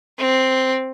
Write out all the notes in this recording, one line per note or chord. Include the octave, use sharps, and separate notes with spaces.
C4